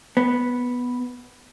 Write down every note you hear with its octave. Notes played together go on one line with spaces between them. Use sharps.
B3